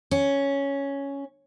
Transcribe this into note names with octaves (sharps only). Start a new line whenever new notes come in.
C#4